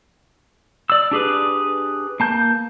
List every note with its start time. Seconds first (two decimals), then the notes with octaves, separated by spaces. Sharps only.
0.90 D5 E6
1.11 D4 G4 G#4 B4
2.20 A#3 A5 G6